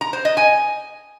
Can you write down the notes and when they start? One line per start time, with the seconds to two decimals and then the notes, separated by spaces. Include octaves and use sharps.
0.01 A#5
0.13 C5
0.25 D#5
0.37 G#5